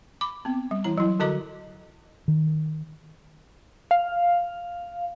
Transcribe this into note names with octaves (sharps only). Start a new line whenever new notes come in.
B5 D6
B3 C4
G3
E3 E4 A#5
F#3 E4
D3 F#4 A4 D#5 A#5 D6
D#3
F5